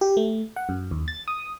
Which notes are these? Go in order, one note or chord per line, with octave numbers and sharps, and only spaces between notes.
G4
A3
F#5
F#2
D#2
A6
D#6